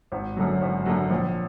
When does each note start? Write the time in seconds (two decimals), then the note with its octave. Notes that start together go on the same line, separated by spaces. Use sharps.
0.12 G#1
0.37 F#2 D3 F#3
0.61 G#1
0.86 F#2 D3 F#3
1.11 A#1